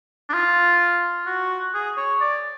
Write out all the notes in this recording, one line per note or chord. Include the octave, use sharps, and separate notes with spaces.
D4
F4
F#4
G#4
C#5
D5